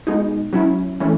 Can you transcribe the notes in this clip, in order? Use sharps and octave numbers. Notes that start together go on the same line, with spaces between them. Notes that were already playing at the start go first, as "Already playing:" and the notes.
B2 G#3 D#4
F#3 C#4 E4
E3 A3 C#4